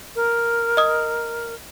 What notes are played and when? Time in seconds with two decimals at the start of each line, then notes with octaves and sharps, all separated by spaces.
0.16 A#4
0.77 D#5 D#6